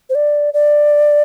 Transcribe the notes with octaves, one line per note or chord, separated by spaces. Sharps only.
C5
D5
D5